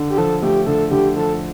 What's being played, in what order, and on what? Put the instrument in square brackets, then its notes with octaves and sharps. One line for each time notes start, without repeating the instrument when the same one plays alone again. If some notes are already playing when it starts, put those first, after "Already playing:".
Already playing: [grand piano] D3
[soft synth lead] G4
[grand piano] F3 [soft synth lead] A4
[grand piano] A3 [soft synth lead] G4
[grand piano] D3 [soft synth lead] A4
[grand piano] D3 [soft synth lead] G4
[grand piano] F3 [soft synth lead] A4